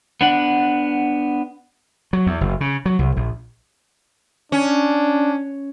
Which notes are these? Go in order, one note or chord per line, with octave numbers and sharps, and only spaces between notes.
B3 D4 F#5
F#3
E2
F#1
C#3
F#3
C2
A#1
C#4 D4